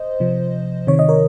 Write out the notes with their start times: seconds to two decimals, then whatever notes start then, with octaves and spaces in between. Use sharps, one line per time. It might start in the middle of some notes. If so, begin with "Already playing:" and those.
Already playing: C5 D#5
0.20 C3 F3
0.87 C3 D#3 C#5
0.99 D#5
1.09 A#4 C#5